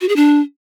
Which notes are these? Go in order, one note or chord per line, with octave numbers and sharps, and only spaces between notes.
F#4
G#4
D4